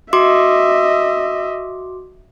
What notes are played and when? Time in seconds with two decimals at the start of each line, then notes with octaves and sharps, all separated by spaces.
0.13 F#4 D#5 E5 C6 D6